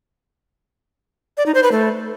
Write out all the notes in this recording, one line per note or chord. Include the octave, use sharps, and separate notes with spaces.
D5
D#4
C5
B4
A3